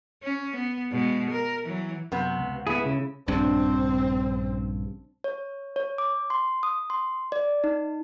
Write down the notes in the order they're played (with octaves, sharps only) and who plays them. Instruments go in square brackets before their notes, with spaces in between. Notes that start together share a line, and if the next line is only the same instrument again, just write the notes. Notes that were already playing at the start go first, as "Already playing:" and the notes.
[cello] C#4
B3
B2 G#3
A#4
E3 F#3
[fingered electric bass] F#2 [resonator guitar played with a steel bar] C3 B3
[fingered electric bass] C#2
[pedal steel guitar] B3 G#4 [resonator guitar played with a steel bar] E4
[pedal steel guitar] C#3
[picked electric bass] A#1 G2 C#3 [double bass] C4 [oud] D4
[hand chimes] C#5
C#5
D6
C6
D#6
C6
D5
D#4